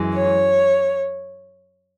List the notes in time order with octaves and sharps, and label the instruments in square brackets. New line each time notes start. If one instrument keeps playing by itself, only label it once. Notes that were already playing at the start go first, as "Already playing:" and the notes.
Already playing: [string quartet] F#2 E3 G#3
C#5